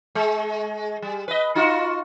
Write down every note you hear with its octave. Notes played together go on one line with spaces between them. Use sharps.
G#3
G3
B4 D#5
D#4 F4 F#4